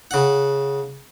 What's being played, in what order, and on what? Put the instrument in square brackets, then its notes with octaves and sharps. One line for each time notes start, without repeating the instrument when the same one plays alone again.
[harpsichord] C#3 F#5